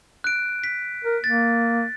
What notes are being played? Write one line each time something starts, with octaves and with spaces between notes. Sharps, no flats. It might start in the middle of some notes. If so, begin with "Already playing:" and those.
F#6 D7
B6
A#4
A#3 A6